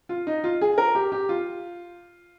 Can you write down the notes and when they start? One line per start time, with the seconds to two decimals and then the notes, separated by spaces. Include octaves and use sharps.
0.09 F4
0.27 D#4
0.44 F4
0.61 G#4
0.78 A#4
0.95 G4
1.12 G4
1.29 F4